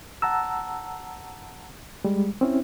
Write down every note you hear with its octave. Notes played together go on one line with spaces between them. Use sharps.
F#5 A5 A#5 E6
G3 G#3
C4 C#4 E4